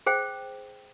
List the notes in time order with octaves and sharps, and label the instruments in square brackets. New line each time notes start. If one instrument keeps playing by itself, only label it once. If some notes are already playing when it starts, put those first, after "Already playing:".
[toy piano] G#4 C5 G5